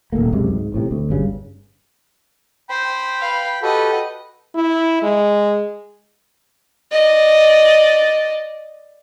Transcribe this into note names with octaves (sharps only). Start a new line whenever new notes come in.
D#1 C#2 A3 A#3
C#2 F#2 C3 G#3
G#2
A1 A2 C3
D2
G1 G2 C#3
C5 G5 B5
B4 F5
F#4 G4 A4 B4 D#5
E4
G#3
D5 D#5